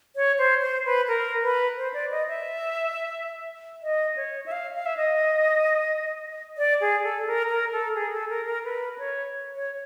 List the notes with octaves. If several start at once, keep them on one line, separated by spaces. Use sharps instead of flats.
C#5
C5
C5
B4
A#4
B4
C5
D5
D#5
E5
D#5
C#5
E5
F5
F5
E5
D#5
D5
G#4
A4
A#4
A#4
A4
G#4
A4
A#4
A#4
B4
C#5
C#5